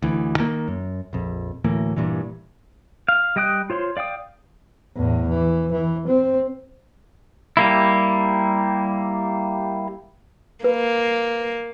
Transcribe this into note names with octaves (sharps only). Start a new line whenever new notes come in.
D2 E3
D#3 A#3
F#2
A#1 F2
D2 A2 E3 A#3
G2 A#2 E3
F5
G3 D#5 G5 D#6 F#6
F4 C5 C#5 C6
D5 F5 G5 D#6
E2 A2
E3
E3
C4
G3 A#3 E4
A#3 B4